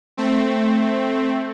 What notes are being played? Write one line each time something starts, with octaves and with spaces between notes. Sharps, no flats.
A3 C4